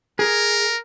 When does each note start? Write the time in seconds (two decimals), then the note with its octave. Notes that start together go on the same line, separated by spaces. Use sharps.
0.19 G#4 A#4